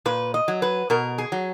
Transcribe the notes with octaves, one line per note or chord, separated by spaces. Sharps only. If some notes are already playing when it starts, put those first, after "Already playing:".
A#2 B4
D#5
F#3
B4
B2 A#4
G#4
F#3